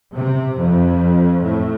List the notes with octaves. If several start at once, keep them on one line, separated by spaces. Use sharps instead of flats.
C3
F2
A2